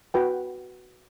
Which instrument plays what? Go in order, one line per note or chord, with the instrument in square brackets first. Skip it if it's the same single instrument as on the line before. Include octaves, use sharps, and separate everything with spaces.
[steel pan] F#4 B4 G5